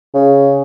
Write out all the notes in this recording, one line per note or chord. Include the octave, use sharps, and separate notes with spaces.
C#3